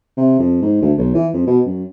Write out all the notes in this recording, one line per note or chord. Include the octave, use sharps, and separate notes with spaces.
C3
F2
G#2
D2
B1
E3
F2
B2
F#2